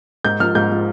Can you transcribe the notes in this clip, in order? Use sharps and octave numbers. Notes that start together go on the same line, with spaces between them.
G#2 G6
F3 F6
G#2 G6
F3